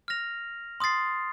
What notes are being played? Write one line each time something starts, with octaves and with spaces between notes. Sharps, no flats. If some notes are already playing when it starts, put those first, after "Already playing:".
F6 A#6 F7
C6 D#6 A6 C7